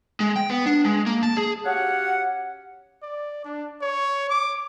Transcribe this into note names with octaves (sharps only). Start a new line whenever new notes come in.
G#3
G5
B3
D4
G#3
A#3
A5
G#4
C#4 F#4 G4 C#5 F5 F#5
D5
D4
C#5
D6